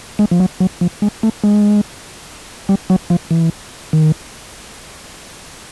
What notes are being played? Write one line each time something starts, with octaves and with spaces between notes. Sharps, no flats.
G#3
F3
F#3
F#3
F3
G#3
A3
G#3
G3
F#3
F3
E3
D#3